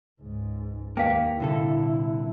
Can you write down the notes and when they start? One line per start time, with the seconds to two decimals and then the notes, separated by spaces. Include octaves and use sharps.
0.22 C#2 G#2
0.97 D#2 D#3 A#3 F5 G5
1.40 C2 A#2 D3 E4 A4